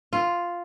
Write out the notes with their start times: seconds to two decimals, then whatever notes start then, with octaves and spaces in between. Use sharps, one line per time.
0.13 F4